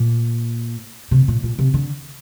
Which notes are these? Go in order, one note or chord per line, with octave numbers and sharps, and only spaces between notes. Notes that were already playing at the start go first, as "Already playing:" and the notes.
Already playing: A#2
C3
A#2
A#2
C3
D3